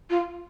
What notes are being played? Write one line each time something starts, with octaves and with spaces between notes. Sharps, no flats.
F4